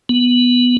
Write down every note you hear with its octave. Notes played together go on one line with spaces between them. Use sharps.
B3